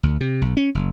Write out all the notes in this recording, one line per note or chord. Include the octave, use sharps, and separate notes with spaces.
D2
C3
B1
C#4
F#1